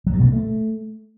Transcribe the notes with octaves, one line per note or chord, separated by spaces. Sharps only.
F#3
G2
B2
A#3
A3